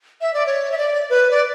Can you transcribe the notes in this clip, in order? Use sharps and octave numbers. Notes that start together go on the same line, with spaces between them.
E5
D5
C#5
E5
D5
B4
D5